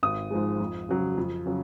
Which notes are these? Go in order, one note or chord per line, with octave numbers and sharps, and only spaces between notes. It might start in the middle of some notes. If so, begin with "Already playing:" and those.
G#1 D#6
G#2 F3 G#3
F2
C#3 F#3
F2
C#3 F#3